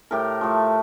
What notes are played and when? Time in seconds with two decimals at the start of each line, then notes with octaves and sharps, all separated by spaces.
0.11 A2 G4 A#4
0.41 F3 A3